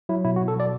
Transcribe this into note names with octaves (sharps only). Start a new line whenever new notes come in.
F#3 E4
B2 E4
F#4
B2
A4
F#3 D5